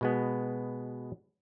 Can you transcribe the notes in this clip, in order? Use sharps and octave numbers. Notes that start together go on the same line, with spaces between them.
B2 G#3 B3